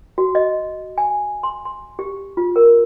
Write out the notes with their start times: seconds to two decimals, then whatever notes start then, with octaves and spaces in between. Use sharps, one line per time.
0.18 F#4
0.35 D#5
0.98 G#5
1.43 C6
1.65 C6
1.99 G4
2.37 F4
2.56 A#4